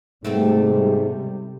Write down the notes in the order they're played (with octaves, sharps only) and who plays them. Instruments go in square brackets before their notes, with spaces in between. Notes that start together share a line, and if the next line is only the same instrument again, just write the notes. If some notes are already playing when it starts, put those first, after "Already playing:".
[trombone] G#2 [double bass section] C3 G3 [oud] A3 B3 C4